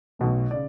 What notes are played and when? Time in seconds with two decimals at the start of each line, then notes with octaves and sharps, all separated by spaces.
0.19 B1 B2 A3
0.51 C#3 D5